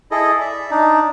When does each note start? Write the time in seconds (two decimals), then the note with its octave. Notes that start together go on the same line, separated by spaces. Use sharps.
0.11 E4 G#4 A4 D#5
0.41 D5 E5
0.71 D4 D#4